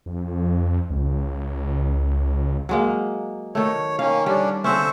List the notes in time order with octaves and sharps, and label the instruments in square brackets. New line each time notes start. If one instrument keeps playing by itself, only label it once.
[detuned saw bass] F2
C#2
[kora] F#3 G#3 A#3
[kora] D#3 A3 [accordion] C#5
[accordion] D#3 A#3 C#4 [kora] F5
[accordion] D3 C#4 D4 [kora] G3
[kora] D3 C4 C#4 [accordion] C5 E5 C#6